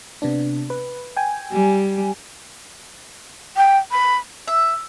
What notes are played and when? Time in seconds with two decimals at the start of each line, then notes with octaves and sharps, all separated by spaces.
0.22 C3 B3 D4
0.70 B4
1.17 G5 G#5
1.52 G3
3.57 G5
3.91 B5
4.48 E5